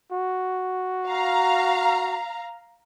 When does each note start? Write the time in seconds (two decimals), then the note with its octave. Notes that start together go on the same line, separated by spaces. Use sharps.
0.12 F#4
1.07 F5 A#5